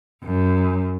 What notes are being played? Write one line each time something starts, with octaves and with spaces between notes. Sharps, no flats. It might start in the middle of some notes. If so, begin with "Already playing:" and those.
F#2